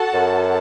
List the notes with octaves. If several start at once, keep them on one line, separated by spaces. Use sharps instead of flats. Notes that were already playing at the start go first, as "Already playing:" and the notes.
Already playing: F#4 A4 F#5 A5
F#2